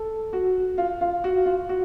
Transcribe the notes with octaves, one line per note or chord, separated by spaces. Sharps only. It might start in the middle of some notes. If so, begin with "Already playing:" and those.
Already playing: A4
F#4
F4
F4
F#4
F4
F#4